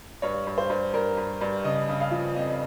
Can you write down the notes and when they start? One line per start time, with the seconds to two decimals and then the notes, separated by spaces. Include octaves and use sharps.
0.22 G2 C#5
0.47 G2
0.58 C5
0.70 G2
0.93 G2 A#4
1.17 G2
1.41 G2
1.64 C#3 D#5
1.89 C#3
2.00 F5
2.11 F3
2.36 F2 D#5